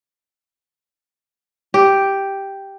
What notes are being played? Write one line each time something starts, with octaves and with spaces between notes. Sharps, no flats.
G4